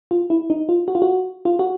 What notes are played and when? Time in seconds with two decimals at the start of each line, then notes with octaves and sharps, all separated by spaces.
0.11 F4
0.30 E4
0.50 D#4
0.69 F4
0.88 F#4
0.95 F4
1.02 F#4
1.45 F4
1.59 F#4